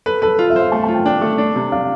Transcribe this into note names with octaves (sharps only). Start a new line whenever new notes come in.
A4 B4
A4 B4
F4
E5
C5 F5
A3 A5
F4 A5
G5
D4 G5
A3
D4
C3
D4 F5